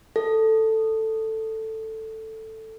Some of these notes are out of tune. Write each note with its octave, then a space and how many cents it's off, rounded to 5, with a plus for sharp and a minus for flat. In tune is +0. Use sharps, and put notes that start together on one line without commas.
A4 +5